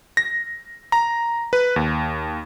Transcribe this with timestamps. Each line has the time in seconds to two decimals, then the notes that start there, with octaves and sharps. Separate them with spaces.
0.17 A#6
0.92 A#5
1.53 B4
1.76 D#2